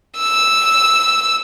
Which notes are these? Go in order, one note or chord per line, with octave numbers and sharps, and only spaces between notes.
E6